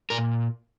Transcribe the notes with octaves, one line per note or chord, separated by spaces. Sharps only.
A#2 A#4